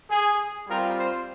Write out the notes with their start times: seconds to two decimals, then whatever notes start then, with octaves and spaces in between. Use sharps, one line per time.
0.09 G#4
0.67 G3 C4 F4 A#4
0.96 C5